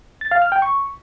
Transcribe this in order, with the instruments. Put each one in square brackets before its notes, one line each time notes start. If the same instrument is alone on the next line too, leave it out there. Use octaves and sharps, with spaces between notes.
[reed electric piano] A6
F5
F6
G5
C#6